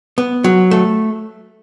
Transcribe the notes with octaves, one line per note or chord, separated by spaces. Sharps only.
B3
F#3
A3